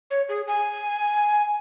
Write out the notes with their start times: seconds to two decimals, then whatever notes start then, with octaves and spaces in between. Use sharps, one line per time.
0.11 C#5
0.29 G#4
0.47 G#5